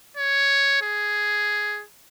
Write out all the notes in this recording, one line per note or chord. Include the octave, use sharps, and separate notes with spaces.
C#5
G#4